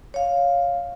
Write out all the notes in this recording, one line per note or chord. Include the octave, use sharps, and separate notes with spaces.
C#5 F5